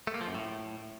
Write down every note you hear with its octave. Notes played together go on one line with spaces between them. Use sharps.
A3
A#3
F3
F#2
A2